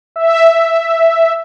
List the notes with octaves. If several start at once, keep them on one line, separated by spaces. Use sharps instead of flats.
E5